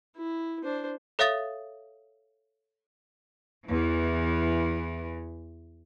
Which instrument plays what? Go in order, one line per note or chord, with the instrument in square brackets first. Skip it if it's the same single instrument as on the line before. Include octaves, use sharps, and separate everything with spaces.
[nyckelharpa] E4
D4 C5
[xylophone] A4 C#5 E5 F5 D#6 A6
[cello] E2 E3